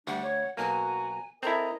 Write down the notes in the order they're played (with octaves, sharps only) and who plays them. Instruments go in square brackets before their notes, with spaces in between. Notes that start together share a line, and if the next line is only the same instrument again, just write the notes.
[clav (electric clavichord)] D2 [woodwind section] G3 D4 G4 [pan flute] F#5
[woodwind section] C#5
[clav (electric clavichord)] B1 A#3 [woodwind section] F#4 [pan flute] G#5 [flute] A#5
[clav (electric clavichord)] C4 E4 [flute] A4 [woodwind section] A#4 D#5 [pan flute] A#5